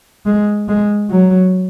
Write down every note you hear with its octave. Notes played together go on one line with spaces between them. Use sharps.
G#3
G#3
F#3